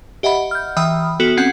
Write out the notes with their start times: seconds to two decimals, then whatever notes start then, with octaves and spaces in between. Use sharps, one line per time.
0.23 G4 D#5 E5 F#5 B5
0.51 F6 G6
0.77 E3 E5 G5 B5 D#6 F6
1.20 B3 F#4 A4
1.37 C4 C#4 F#5 F#6